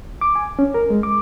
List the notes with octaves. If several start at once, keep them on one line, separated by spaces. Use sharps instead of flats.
D6
G#5
C#4
A#4
G#3
D6